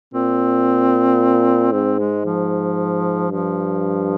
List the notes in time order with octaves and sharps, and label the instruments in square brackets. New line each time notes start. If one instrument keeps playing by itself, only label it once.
[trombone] A#2 [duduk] C4
[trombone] G#2 [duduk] C4
[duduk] G#3
F3
[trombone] G2 [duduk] F3